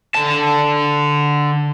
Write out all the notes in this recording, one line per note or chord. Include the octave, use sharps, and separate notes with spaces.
D3 A5